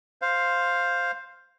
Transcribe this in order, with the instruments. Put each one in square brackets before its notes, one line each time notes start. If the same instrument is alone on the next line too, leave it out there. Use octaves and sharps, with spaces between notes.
[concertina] C5 F5